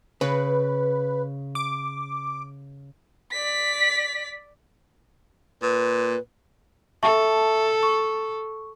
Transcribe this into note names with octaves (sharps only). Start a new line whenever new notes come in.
C#3 B4
D6
D5 B6
A#2 B4
A4 E5 A5 C#6
C#6